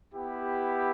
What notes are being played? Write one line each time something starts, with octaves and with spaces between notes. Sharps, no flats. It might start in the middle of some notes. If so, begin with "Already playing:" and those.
B3 E4 G4